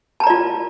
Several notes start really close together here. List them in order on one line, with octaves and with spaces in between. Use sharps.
A5 A#5 D5 F4